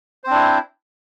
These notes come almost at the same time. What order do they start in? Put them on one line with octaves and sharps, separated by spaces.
C5 C4 D4 E4